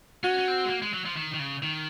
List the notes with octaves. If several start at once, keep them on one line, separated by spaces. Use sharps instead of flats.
C#4 F#4
C#4
C4
G#3
A#3
G#3
F#3
F3
D#3
D#3
C#3
D#3